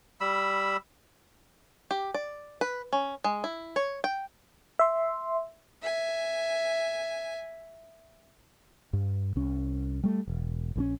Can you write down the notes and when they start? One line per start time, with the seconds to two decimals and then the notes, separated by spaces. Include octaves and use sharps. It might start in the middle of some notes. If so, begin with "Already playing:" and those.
0.21 G3 B5 E6
1.91 G4
2.14 D5
2.61 B4
2.93 C#4
3.24 G#3
3.44 E4
3.76 C#5
4.04 G5
4.79 E5 C6
5.82 E5 G#5
8.93 G2
9.36 C2 C#4
10.04 G3 A3
10.28 E1
10.76 A#1 D3 C#4